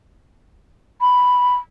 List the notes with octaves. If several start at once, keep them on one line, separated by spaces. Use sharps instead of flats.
B5